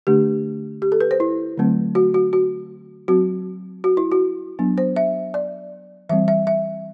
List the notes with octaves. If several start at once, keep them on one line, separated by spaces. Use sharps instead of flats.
D3 A3 D4 G4
G4
A4
B4
C5
E4
D3 F#3 A3 C4
F#4
F#4
F#4
F#3 C4 F#4
F#4
E4
F#4
F#3 B3 D4
C5
E5
D5
E3 G3 C4 E5
E5
E5